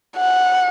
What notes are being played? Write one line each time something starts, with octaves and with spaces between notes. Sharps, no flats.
F#5